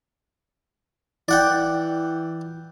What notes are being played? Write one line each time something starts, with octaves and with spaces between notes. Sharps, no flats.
E3 D5 F#5 G5